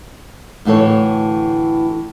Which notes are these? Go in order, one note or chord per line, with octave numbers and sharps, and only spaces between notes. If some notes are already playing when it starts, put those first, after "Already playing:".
D2 A2 E3 A4 C#5